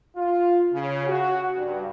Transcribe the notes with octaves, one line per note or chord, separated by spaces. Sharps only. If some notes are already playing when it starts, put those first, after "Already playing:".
F4
C#3
F#4
G2